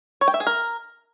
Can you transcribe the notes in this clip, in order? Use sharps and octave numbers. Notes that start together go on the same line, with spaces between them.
C#5
G5
E5
G#4
A#4